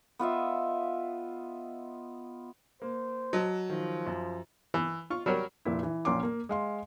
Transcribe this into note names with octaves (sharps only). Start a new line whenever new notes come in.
B3 F4 D#5 E5
A#3 C5
F#3 D#5 A5
D#3 F3
F#2
E3
F4 C#6
F#3 G3 A#4 C#5
F1 A#2 E4
E3
A#1 A#2 C#4 A#5 C6 D6
A#3
G#3 F5 C6